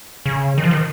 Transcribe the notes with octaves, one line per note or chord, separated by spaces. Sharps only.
C#3
D#3
F3
D#3